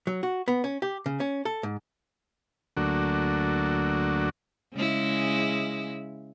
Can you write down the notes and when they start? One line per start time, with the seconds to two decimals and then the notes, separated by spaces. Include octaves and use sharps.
0.07 F#3
0.23 F#4
0.48 B3
0.64 C#4
0.82 G4
1.06 C#3
1.20 C#4
1.45 A4
1.63 G#2
2.77 D2 F#3 A3 A#3 D4 F#4
4.74 C#3 G#3 E4